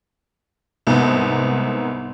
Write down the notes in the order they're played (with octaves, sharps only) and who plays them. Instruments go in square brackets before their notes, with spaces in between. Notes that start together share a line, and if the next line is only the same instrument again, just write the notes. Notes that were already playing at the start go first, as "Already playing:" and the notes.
[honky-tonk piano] C2 G#2 B3